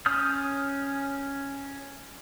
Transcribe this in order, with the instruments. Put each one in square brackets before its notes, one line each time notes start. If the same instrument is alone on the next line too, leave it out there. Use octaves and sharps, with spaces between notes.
[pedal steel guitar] C#4 D#6 F6 G6